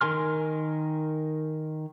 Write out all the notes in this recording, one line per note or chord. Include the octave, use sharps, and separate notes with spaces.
D#3 A#4 G#5 C6 F6